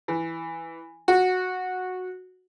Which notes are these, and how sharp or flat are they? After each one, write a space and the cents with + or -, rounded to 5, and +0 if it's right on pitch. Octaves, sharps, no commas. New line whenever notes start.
E3 +5
F#4 -10